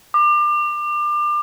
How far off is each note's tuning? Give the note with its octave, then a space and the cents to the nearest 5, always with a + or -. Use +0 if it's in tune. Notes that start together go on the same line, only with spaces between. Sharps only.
D6 +30